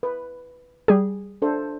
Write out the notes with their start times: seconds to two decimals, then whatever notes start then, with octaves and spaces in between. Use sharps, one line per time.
0.03 B4
0.88 G3 G#4
1.42 D4 A4 C5